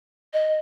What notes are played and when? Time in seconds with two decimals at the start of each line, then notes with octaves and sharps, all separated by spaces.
0.33 D#5